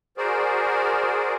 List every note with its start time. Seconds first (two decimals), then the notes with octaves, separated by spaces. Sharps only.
0.17 F#4 G#4 A#4 C5 D5